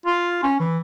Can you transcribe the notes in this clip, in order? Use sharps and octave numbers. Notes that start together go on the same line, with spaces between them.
F4
C#4
E3